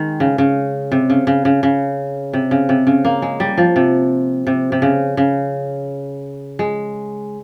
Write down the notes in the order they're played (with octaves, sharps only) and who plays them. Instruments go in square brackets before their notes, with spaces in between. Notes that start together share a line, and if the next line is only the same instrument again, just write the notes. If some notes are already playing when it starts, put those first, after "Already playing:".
Already playing: [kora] D#3 G#3
C#3
C#3
C3
C#3
C#3
C#3
C#3
C3
C#3
C3
C#3
A#3
G#3
G3
F3
C3
C3
C3
C#3
C#3
G#3